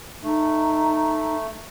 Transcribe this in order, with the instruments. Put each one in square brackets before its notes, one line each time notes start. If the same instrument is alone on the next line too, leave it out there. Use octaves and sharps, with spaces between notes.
[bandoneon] A3 [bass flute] D#4